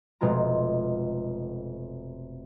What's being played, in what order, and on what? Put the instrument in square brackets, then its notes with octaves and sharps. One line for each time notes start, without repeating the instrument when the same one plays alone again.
[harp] F1 B2 G#3 F4 A#5